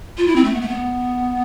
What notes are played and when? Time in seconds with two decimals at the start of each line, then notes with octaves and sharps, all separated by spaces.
0.17 F4
0.27 E4
0.36 C4
0.44 A3
0.54 B3
0.61 A3
0.69 B3